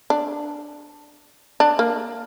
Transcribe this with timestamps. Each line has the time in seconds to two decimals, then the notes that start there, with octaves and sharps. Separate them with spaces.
0.10 D4
1.60 D4
1.79 A#3